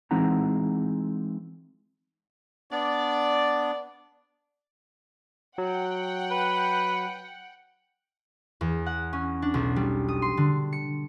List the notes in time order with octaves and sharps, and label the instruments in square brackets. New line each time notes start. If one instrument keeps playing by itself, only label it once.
[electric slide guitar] E3 G#3 C4 D#4 F#5 A#5
[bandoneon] B3 D4 [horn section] D5
[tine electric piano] F#3 [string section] F#5 G5
[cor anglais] B4
[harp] E2
F#5
C#4
D4
B1
G3
D#6
C6
D3
C#7